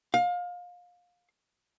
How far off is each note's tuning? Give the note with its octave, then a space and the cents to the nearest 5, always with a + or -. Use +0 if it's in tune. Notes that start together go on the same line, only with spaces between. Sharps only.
F5 +25